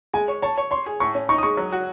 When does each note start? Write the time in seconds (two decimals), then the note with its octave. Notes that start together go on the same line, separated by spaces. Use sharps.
0.13 G#3 G#5
0.28 C#5
0.42 C#5 A5
0.58 C#5
0.71 C#5 C6
0.86 G#4
1.00 A2 C#6
1.15 C#4
1.29 D#4 C#6
1.38 D#6
1.43 G#3 C#6
1.57 F#3
1.72 F#4